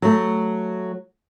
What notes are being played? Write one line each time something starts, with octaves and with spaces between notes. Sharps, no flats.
F#3 A3